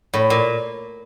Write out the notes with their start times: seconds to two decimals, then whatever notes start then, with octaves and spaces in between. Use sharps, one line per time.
0.14 A2
0.30 A#2